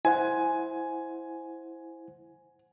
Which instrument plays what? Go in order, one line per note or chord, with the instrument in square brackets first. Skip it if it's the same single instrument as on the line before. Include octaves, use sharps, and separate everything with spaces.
[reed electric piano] E4 C5 F#5 [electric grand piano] G#5